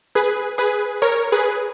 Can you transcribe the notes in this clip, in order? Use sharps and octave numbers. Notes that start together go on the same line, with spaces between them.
G#4 B4
G#4 B4
A#4 C#5
G#4 B4